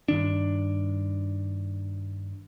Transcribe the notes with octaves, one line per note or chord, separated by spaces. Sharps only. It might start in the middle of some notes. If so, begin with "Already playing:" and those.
G2 D#3 D4